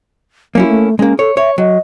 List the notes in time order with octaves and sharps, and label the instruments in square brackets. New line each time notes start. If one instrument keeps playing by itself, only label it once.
[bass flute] F#3 [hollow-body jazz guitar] A#3 C#4 E4
[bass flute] A3
[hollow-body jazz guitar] G#3 A#3 [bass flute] C#4
[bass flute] A4 [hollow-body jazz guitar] C#5
[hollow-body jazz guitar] C#5 [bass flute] E5
[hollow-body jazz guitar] F#3 [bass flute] D#5